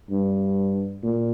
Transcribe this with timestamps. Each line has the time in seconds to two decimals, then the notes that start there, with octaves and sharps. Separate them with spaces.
0.11 G2
1.03 A#2